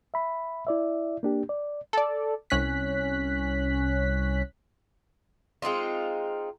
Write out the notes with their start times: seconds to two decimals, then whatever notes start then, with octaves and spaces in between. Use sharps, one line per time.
0.14 E5 B5
0.67 E4 D5 E5
1.23 A#3 D4 G4
1.49 D5
1.93 A4 D5
2.50 C2 C#4 F#6 B6
5.62 G#3 C4 D#4 F4